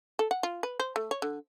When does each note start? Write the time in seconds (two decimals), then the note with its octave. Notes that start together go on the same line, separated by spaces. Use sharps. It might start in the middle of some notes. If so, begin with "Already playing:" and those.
0.19 A4
0.31 F#5
0.43 F4
0.63 B4
0.79 C5
0.96 A3
1.11 C#5
1.22 D3